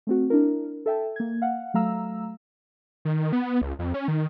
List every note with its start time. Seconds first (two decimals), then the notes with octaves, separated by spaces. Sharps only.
0.07 A3 C4 F#4
0.30 D4 E4 A#4
0.86 A4 E5 G5 A5
1.16 A#3 G#6
1.42 F5 F#5
1.74 F#3 A3 F5 A#5 E6
3.05 D#3
3.33 B3
3.62 C#2
3.79 F2
3.94 C#4
4.08 D#3